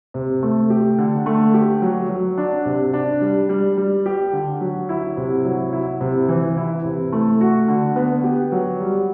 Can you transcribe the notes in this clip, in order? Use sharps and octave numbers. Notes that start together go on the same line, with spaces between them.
C3
A3
G4
D3
A3
G4
F#3
F#3
D4
C3
D4
G3
G3
G3
G4
D3
F#3
E4
C3
F#3
E4
C3
E3
E4
C3
A3
F#4
D3
B3
G4
F#3
G3